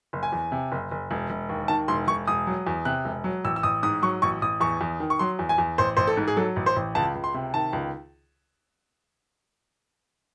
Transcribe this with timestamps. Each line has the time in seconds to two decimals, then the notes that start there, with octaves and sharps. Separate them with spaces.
0.13 F#1
0.23 G#5
0.32 E2
0.52 C3
0.72 F#1
0.91 F#1
1.11 E1
1.30 E1
1.49 D#2
1.68 D#3 A5
1.88 E1 C6
2.07 E1 C#6
2.27 E1 D#6
2.47 F#3
2.67 E2
2.85 C3 F#6
3.05 E1
3.24 F#3
3.44 A1 E6
3.56 E6
3.63 A1 D#6
3.83 G#2 D#6
4.02 F#3 C#6
4.22 A1 C#6
4.42 A1 D#6
4.61 E2 C#6
4.81 E2
5.00 D#3
5.10 C#6
5.19 F#3 C6
5.39 E2
5.49 G#5
5.58 E2
5.78 A1 C5
5.97 A1 C5
6.07 A4
6.17 G#2
6.28 G#4
6.36 F#3 A4
6.56 A1
6.66 C5
6.76 A1
6.95 C#2 A5
7.15 C#2
7.24 C6
7.34 C3
7.54 D#3 A5
7.73 C#2